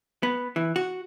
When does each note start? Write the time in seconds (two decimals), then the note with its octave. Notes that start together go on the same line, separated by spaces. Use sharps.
0.23 B3
0.56 E3
0.76 F#4